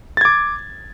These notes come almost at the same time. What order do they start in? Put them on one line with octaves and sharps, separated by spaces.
A6 G#6 D6